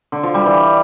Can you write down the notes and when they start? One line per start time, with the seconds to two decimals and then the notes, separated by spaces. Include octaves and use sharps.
0.12 D3
0.23 F3
0.34 G3
0.45 E3